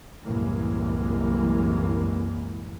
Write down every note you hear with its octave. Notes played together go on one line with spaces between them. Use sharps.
C2 F#2 A2 E3 G#3 A#3